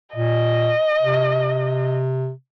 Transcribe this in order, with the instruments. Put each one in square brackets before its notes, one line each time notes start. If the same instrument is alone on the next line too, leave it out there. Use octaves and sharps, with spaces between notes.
[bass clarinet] A#2 [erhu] D#5
[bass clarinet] C3